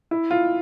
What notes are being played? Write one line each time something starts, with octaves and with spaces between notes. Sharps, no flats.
E4
F4